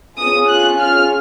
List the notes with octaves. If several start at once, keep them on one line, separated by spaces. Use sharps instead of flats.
C#4 F4 G#4 D#6
F#6
F6